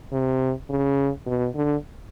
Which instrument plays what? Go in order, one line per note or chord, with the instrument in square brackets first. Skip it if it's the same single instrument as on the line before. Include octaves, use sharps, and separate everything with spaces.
[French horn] C3
C#3
B2
D3